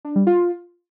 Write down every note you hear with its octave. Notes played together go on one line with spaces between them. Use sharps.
D4
G3
F4